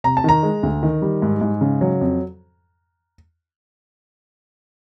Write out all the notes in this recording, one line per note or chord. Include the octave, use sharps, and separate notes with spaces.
C3 A#5
A5
D#3 A#5
G#3
D2
D#3
G3
G#2
G#2
C#3
F#3
F2